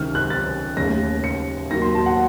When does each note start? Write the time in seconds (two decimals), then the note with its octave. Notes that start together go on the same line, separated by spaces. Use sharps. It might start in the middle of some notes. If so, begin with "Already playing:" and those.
Already playing: C#2 C3 D#3 F6
0.15 F#6
0.30 A6
0.77 D#2 C#3 A3 A#6
1.24 C#7
1.71 D#2 D#3 F#3 A#3 A#6
1.82 C6
1.95 A5
2.06 F#5